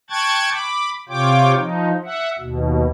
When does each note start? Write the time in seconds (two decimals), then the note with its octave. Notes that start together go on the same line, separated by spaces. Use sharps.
0.10 G5 A5 C#6 F#6 G#6 A6
0.51 B5 D6
1.09 C3 F4 C#5 G5 D6
1.56 F3 D#4
2.04 E5 F#5
2.39 D#2 B2